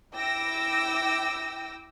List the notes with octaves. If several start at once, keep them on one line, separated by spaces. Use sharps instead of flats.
E4 G5 D6 E6 A#6